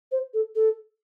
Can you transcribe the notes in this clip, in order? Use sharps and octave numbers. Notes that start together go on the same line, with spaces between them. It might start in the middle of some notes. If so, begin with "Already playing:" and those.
C5
A4
A4